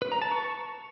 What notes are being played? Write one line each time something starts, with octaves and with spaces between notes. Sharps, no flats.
B4
A#5
A5
C#6